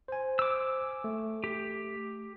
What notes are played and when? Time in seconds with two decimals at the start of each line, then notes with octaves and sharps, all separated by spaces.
0.08 C5 G#5
0.39 D6 E6
1.04 A3
1.44 G4